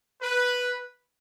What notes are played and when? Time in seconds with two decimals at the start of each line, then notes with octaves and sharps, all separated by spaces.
0.22 B4